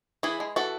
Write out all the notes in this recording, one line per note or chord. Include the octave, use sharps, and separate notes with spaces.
E3 E4 G#4
G#3
E3 F#4 A4